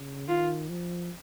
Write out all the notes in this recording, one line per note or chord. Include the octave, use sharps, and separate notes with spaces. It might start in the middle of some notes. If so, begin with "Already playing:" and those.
Already playing: C#3
D#3 F4
F3